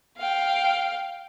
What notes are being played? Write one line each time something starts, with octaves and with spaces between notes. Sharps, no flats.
F5 G5